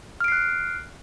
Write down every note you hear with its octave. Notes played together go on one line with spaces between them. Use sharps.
F6 F#6 C7 D7